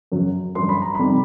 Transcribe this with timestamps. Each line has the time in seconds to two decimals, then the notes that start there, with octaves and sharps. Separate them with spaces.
0.12 F#2 C#3 F#3
0.55 F#2 D3 G3 C6
0.69 B5
0.82 A#5
0.95 F2 C3 D#3 G3 B5